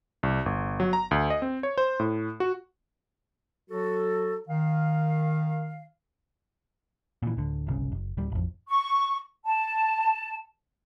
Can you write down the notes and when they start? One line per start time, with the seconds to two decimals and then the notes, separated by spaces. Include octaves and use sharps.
0.23 C2
0.46 G1
0.80 F#3
0.93 A#5
1.11 D2
1.30 D#5
1.42 C4
1.63 C#5
1.78 C5
2.00 A2
2.40 F#4
3.69 F#3 F#4 A4
4.49 D#3 F5
7.23 A#2 E3
7.37 D1 D3
7.67 G1 C2 C#3
7.92 F#1
8.17 D1 G3
8.32 A1 F2
8.68 C#6
9.45 A5